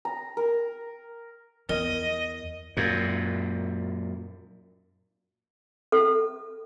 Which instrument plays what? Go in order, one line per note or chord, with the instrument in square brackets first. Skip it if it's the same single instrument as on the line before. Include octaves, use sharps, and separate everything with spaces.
[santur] A#5
A#4
[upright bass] E2 [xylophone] A#4 [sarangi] D#5
[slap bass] F#2 A#2
[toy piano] A4